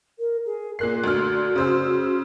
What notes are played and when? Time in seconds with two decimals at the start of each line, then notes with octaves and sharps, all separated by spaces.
0.19 A#4
0.45 G#4
0.79 A#2 A#4 F#6 C7
1.04 D2 D4 F#4 F6
1.56 C#3 C5 E6